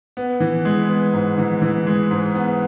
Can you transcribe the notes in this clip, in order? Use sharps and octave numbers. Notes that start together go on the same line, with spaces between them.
B3
E3
G#3
B3
G#2
E3
E3
G#3
G#2
B3